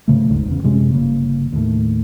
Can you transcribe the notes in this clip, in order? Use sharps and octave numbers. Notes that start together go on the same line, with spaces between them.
G#2 C#3 A3
F#1 D2 G#2
E2 C#3
F#2 C3 G#3 C#4
G1 C#3 A#3
D#2 A2